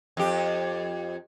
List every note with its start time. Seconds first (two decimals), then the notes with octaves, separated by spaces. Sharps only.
0.17 F2 G4